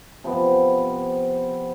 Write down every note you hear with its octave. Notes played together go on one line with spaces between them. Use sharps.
C3 F3 B3